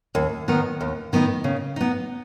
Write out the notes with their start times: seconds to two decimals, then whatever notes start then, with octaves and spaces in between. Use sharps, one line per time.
0.15 D#2
0.48 D#3 B3 D#4
0.81 D#2
1.13 D#3 B3 D#4
1.44 C#3
1.76 B3 D#4